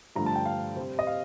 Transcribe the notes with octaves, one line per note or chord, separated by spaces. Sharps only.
G2 D3 F3 A3 A#5
A5
G5
F5
C3 G3 C4
D#5
F5